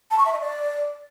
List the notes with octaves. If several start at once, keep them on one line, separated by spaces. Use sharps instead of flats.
A5
C#6
E5
D#5
D5